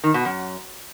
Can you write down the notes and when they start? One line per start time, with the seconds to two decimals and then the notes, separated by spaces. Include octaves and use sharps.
0.04 D#3
0.14 B2
0.25 F#2